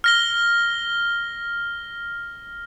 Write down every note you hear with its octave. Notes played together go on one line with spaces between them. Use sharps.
F6 A#6 G7